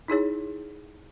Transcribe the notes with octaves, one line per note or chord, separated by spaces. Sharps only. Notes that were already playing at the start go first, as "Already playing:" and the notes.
D#4 E4 G#4 C#5